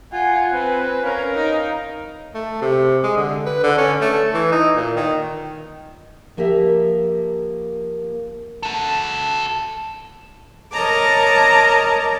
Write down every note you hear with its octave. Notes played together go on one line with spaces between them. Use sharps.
F4 F#5 G#5
C4 B4
C#4 A#4 F5
D#4
A3
C3
G#3
D3
B4
D3
C#4
A3
E3
D#4
A#2
D#3
F3 A#3 G4 A#4 E5
F#4 A4
A#4 C#5 D#5 A5 A#5 D6